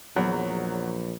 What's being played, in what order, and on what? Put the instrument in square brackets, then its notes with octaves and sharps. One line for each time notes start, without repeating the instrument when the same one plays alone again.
[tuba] A#1 [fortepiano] E2 [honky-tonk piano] F#3